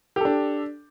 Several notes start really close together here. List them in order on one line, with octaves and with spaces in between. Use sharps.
G4 A4 D4